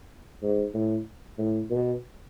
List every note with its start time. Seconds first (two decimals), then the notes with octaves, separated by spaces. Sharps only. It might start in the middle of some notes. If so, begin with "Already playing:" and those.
0.42 G#2
0.74 A2
1.38 A2
1.70 B2